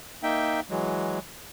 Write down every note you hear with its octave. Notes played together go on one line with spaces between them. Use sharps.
A#3 D#4 E5 G5
E3 F#3 G#3